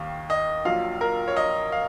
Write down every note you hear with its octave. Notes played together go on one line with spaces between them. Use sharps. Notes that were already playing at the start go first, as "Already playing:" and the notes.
Already playing: D#2 D#3 F5
D#5
A#1 A#2 F#3 F5
A#4
C#5
D#5
F5